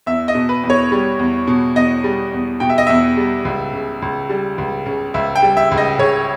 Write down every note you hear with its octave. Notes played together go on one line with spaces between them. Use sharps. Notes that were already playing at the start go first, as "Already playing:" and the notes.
E2 E5
D#5
B2
B4
E2
C#5
G3
E2
B2
E2 D#5
G3
E2
B2 G5
E5
D#5
E2 E5
G3
C#2
C#3
C#2
G3
C#2
C#3
C#2 E5
G5
G3
E5
C#2
D#5
C#3 C#5